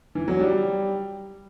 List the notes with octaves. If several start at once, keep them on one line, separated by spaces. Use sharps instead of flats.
E3
F#3
G3